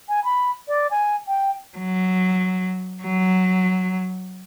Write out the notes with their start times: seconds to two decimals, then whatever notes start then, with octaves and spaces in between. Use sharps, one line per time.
0.09 G#5
0.24 B5
0.68 D5
0.91 G#5
1.28 G5
1.78 F#3
3.03 F#3